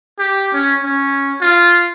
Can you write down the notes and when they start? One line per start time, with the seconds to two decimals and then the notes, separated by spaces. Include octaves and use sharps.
0.19 G4
0.53 C#4
0.83 C#4
1.41 F4